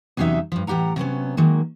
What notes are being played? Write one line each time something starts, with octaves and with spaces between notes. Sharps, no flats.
E2 C3 F#3 C#4 D#4 E5
G2 F3
A2 E3 G4 F#5 A#5
C3 F#3 B3 C#4
D#3 F#3 G#3 A#3